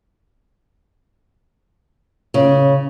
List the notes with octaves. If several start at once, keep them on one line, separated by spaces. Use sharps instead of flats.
C#3